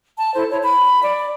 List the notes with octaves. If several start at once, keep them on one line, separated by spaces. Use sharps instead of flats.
A5
E4 A4 C5
E4 C#5
B5
D5